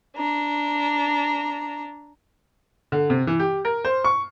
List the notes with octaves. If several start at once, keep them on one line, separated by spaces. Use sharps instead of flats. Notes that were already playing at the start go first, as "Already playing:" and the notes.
D4 A#5
D3
C3
E3
G4
A#4
C5
C#6